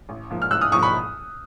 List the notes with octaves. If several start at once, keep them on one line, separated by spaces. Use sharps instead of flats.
A1
G#2 F3 A#3
F6
A1 E6 F#6
D#6 F6
G#2 F3 A#3 C#6 D#6
B5 C#6